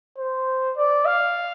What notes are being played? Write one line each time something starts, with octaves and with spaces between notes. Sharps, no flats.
C5
D5
F5